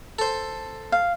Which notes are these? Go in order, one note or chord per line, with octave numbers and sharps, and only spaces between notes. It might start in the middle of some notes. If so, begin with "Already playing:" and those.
A4 C5
F5